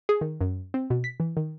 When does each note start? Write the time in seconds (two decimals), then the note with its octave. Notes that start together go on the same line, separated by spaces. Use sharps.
0.09 G#4
0.21 D#3
0.41 F#2
0.74 C4
0.90 B2
1.04 B6
1.20 E3
1.37 D#3